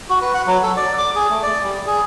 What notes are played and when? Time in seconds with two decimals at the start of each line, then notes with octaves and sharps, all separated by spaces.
0.09 F#4
0.21 B4
0.34 F#5
0.47 F#3
0.63 A4
0.77 D5
0.98 D6
1.15 G#4
1.30 A3
1.43 D5
1.64 G3
1.87 G#4